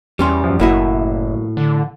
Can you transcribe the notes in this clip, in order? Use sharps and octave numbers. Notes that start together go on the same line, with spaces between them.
E2 G3 C#4 C6
F#2 F3
F#1 A2 F#3 A#3 E4 F#4 D#5
D3